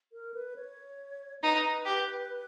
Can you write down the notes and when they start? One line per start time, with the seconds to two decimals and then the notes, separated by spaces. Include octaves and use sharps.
0.13 A#4
0.34 B4
0.56 C#5
1.42 D#4 B4
1.85 G4